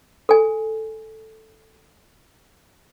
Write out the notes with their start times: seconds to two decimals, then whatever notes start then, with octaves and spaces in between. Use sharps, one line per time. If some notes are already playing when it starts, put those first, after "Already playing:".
0.29 A4 G#5